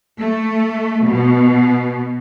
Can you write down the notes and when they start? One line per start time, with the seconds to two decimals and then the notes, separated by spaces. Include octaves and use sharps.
0.19 A3
1.06 B2